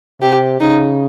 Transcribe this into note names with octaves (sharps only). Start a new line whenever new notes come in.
C3 G4
C#3 D#4